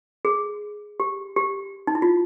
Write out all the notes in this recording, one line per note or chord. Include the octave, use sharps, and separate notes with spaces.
G#4
G4
G4
D#4
E4
F4